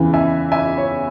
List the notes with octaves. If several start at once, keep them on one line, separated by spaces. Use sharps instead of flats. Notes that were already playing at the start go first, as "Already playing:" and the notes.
Already playing: E2 C#3 E3
E5 G#5
E5 G#5
C#5